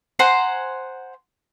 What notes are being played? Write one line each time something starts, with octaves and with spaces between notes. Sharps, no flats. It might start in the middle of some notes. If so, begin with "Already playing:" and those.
C5 F#5 G#5 A#5